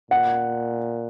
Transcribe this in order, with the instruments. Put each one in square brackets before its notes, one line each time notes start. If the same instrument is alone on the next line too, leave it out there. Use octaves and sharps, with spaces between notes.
[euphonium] A#2 [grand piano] F#5